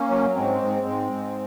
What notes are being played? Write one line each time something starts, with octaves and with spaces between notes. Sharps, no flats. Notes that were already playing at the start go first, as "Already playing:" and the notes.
Already playing: A#3 C#4
F#3
G#2 G#3 C4
G#2
G#2
G#2